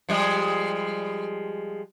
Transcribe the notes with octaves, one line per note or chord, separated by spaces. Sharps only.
F3 G3 G#3